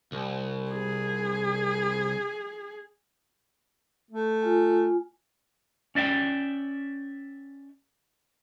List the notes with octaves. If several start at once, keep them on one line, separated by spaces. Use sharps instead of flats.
C2
G#4
A3
F4 G#5
C#4 D5 E5 G5